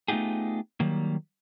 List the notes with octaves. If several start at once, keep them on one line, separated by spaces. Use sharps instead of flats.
A3 B3 D#4 F4 G4 G#4
D#3 F#3 G3 A#3